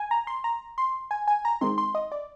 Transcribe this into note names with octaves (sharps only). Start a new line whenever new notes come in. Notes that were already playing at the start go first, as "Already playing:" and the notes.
Already playing: G#5
A#5
C6
A#5
C6
G#5
G#5
A#5
D#3 G#3 C4 D#4 C6
C6
D#5
D5